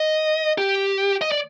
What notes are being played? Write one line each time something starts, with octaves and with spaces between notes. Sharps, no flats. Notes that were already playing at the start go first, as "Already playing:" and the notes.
Already playing: D#5
G4
D#5
D5